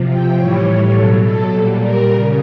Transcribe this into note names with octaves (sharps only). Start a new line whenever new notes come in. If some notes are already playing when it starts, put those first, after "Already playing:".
Already playing: C3 F3
G5
A2 E3 G3 C#5
B2 F#3 A4
A4
A#2 G3
A#4
C#3